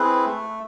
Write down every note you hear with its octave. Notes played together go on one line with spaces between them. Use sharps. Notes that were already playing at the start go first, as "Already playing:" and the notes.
Already playing: C4 E4 G#4 B4
A3